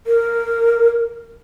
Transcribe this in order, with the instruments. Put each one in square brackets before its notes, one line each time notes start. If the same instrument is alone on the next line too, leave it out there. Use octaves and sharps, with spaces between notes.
[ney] A#4